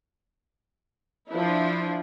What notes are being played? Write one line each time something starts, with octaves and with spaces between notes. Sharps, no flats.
F3 D4 E4